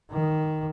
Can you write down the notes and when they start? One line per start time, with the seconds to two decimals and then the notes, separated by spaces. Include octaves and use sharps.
0.11 D#3